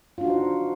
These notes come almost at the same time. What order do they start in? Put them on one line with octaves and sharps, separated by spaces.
F4 D4 F#4 D#4 C5